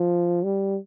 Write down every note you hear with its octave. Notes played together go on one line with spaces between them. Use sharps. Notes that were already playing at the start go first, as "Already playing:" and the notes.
Already playing: F3
G3